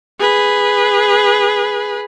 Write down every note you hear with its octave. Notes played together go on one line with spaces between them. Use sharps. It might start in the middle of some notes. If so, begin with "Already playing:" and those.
G#4 B4